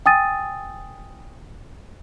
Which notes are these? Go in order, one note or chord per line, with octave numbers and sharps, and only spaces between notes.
G5 G#5 D#6 E6 A6 D#7